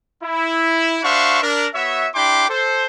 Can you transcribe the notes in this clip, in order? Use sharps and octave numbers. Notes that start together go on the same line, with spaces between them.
E4
D4 F#4 C5 E5 F5 C#6
D4 A#4
B3 F#4 C#5 E5
D4 E4 G4 G5 C6 D6
A4 C5